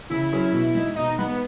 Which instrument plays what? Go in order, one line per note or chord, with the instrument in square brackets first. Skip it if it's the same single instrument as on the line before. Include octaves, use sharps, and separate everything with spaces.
[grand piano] C#3 [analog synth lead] E4
[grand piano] F#3 C#4 G#4
B2
G#3 D#4
[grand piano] B2 [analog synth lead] D#4
[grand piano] G#3 D#4 [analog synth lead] B3